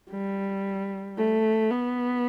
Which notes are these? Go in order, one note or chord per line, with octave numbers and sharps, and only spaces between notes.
G3
A3
B3